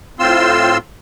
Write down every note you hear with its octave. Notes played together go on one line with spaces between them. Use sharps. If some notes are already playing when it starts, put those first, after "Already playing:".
A2 C4 F4 C6 E6